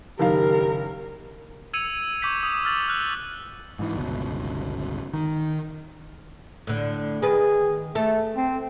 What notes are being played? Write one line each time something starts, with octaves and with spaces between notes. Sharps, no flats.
F#1 D#3 G4 A#4 F5
E6 G#6 C#7 D#7 F7
C#6 D6 G6 B6
D#6
E6 F6 A6 F#7
F6 F#6
G#2 E3
G1 C#2 B2
D#3
A2 D3
D#3 G#4 B4
A3 A4
C4